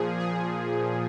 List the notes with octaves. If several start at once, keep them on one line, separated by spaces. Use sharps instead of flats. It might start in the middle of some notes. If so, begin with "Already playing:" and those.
Already playing: A#2 F3 G#4
G#4